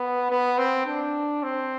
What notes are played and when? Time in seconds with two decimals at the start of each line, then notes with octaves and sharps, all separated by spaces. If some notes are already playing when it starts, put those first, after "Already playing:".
Already playing: B3
0.30 B3
0.58 C4
0.86 D4
1.43 C4